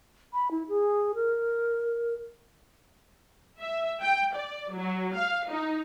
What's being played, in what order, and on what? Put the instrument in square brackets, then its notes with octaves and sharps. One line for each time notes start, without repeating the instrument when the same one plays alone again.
[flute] B5
E4
G#4
A#4
[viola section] E5
G5
D5
F#3
F5
D#4